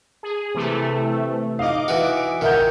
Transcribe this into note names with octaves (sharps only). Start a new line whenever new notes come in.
G#4
C3 E3 A3
D#4 D#5 F5 D6
E3 F#4
A#1 D#3 C#5 E5 F#5 G6